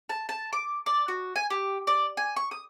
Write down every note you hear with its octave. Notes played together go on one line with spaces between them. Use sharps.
A5
A5
D6
D5
F#4
G#5
G4
D5
G#5
C#6
D#6